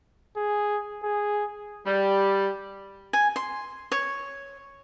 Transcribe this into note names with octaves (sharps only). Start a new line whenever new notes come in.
G#4
G#4
G3
G#5
C6
C#5